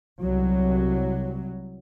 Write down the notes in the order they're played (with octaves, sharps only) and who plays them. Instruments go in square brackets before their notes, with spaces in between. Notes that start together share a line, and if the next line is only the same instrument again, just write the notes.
[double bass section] C2 F#3